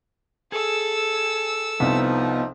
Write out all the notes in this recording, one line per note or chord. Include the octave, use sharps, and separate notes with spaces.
G#4 A4 E6
C2 F3 B3 C4 D#4